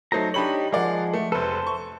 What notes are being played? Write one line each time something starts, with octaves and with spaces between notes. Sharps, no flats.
F#3 A3 D#4 A4 C5 A#5
D4 D#4 G4 C#5 B5 F#7
F3 G#3 A#4 D5 F#5
A3
F1 A4 B4 C5
C#6